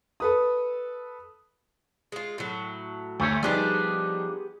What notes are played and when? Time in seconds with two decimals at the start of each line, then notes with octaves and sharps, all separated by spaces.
0.20 A4 B4 D#6
2.12 G#3 F4
2.38 A2 F#3
3.20 D2 A3 G4 C#5
3.43 F3 G3 B3 D4 D#4 G4 G#4